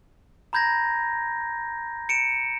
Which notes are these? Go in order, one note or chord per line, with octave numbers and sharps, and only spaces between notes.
A#5 B5 G6 G#6 A#6
C#7 D7 E7